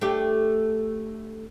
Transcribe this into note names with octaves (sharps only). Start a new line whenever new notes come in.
A3 D4 G4